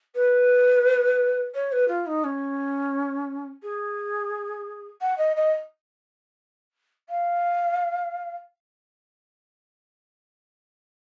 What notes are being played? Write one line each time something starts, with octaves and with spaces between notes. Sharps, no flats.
B4
C#5
B4
F4
D#4
C#4
G#4
F#5
D#5
D#5
F5